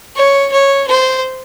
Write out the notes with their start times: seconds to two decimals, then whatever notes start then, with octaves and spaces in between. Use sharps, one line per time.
0.16 C#5
0.52 C#5
0.87 C5